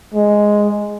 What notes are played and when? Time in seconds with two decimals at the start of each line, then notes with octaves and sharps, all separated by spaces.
0.14 G#3